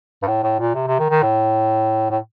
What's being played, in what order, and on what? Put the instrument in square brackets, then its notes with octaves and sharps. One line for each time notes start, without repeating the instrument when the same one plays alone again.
[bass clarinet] G2
A2
A2
A#2
C3
C3
D#3
D#3
A2
A2